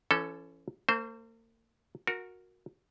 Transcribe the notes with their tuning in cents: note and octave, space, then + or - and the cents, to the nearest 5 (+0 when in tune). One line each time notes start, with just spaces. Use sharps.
E3 +35 C#4 +0 A4 +0
A#3 -45 C5 +0
F#4 -20 A#4 +0